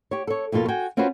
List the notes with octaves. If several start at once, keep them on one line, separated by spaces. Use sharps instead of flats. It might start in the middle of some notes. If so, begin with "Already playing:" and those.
G4 C#5
A4 C#5
F2 B2 A#3 F4 A4
F#4 G5 G#5
C4 C#4 F4 F#4 B4 C5